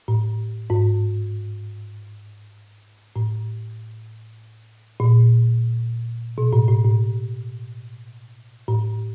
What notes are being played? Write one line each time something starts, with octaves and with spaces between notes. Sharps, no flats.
A2
G#2
A2
A#2
B2
A2
A2
A2
A2